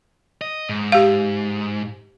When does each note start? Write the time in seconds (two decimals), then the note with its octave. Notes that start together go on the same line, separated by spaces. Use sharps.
0.41 D#5
0.69 G#2
0.92 G4 F5